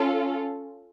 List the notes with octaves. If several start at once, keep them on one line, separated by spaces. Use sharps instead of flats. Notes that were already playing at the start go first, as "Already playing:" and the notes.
Already playing: C#4 F4 A4